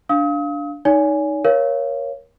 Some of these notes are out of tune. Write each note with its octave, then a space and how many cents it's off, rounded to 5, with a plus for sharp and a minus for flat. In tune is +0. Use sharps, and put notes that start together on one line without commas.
D4 -10 F5 +0 D#6 +40
D#4 +0 C#5 +45 G#5 +0
A#4 +25 C#5 +0 F5 -25